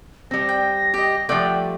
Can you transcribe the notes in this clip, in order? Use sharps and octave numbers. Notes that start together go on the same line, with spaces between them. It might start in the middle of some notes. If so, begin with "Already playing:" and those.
G3 C4 A#6
G5
G4 D#5
F3 G3 A3 D5 F#5 G5